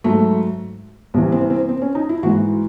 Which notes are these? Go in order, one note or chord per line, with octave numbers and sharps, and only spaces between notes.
G#2 F#3 A3
C2 C3 E3
C4
C4
C4
C#4
D#4
E4
G#2 E3 F#4